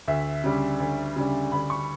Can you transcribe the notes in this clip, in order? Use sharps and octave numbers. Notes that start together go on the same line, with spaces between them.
D2 E5
C#3 G3 D4
D2
C#3 G3 D4
D2 B5
C#6